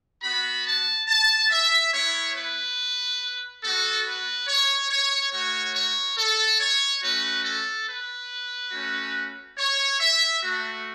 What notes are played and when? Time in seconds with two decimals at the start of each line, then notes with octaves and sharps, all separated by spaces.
0.22 B3 F#4 B5
0.65 A5
1.08 A5
1.50 E5
1.93 B3 E4 C#5
2.35 B4
3.63 B3 F#4 A4
4.05 B4
4.47 C#5
4.90 C#5
5.32 A3 F#4 C#5
5.75 C#5
6.17 A4
6.60 C#5
7.02 A3 C#4 F#4 B4
7.45 A4
7.87 B4
8.72 A3 C#4 F#4
9.57 C#5
10.00 E5
10.42 A3 F#4